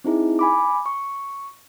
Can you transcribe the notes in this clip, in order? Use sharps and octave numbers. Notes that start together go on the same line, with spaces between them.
C4 D#4 E4 G#4
G#5 B5 D6
C#6